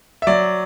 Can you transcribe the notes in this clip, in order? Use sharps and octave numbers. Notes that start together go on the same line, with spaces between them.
E5
F#3 D5